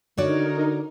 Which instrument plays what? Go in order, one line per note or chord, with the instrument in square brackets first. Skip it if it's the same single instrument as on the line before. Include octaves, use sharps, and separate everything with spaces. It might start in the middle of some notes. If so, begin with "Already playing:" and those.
[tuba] D3 [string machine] D#4 A#4 [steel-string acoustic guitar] F#4 C#5 D5